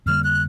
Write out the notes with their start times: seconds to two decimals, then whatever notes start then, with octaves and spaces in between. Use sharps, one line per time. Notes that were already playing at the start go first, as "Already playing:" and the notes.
0.06 F2 D3 G3 A#3 F6
0.24 F#6